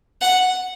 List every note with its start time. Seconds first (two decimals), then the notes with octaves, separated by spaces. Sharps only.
0.21 F#5